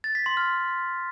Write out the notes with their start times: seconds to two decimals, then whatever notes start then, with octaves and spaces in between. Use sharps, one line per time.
0.04 A6
0.15 B6
0.26 C6
0.37 F6